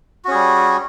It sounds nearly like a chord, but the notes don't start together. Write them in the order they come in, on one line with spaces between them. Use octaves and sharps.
F#4 C#4 G#4 G3